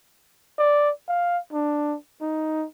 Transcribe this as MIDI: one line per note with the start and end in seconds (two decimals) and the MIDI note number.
0.58 0.91 74
1.08 1.38 77
1.53 1.96 62
2.21 2.66 63